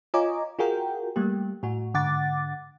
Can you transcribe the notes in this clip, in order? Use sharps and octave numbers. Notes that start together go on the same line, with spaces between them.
F4 C#5 D#5 G#5 A#5 D6
F4 F#4 G#4 A#4 G5
G3 A3 A#3 G4
A2 F#4
G#2 D3 F#5 D6 A6